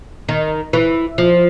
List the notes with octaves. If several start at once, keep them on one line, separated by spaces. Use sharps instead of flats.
D#3
E3
F3